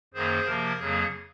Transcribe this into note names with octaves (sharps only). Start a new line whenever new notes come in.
F#2 D#3 A#3 G#4 C5
C3 F3 A#3 A#4
F2 C#3 F#3 A#3 G#4